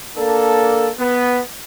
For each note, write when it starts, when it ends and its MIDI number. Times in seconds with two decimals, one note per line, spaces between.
0.16 0.89 58
0.16 0.89 62
0.16 0.89 69
0.98 1.38 59